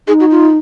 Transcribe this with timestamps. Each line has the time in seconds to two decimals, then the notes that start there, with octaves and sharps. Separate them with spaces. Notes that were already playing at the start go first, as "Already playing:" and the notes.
0.08 D#4 G#4
0.20 F#4
0.31 F4